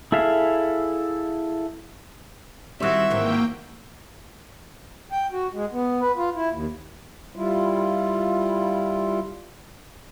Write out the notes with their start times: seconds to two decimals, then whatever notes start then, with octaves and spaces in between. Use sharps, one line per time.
0.12 E4 G#4 A4 E5 F5
2.80 D#3 G3 C4 E4 F#4 E5
3.10 G#2 D#3 E3 A#3 G5
5.12 G5
5.32 F#4
5.54 G#3
5.73 B3
6.01 B4
6.17 F4
6.36 E4
6.50 D#2
7.36 G3 E4 F4